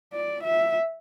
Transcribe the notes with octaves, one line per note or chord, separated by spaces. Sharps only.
D5
E5